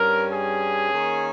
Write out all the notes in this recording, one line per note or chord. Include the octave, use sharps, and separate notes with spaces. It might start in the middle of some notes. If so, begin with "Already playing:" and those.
Already playing: G2 G3 C#4 A#4
G#4
D#3 A#3 C#4